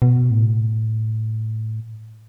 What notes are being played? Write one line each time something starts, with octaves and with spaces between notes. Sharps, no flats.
B2
A2